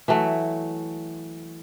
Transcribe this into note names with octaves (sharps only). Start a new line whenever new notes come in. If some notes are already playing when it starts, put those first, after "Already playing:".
E3 F#3 A3